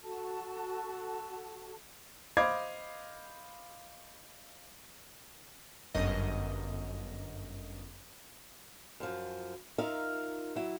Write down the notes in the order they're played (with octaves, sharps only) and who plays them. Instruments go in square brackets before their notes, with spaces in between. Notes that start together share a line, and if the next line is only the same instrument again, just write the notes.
[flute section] F#4 A4 A5
[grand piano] C5 D#5 F5 B5 D6 G#6
[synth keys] G1 F#2 D#5
[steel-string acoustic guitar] F#2 F3
D#4 F4 A#4 E5 F5
F#3 E4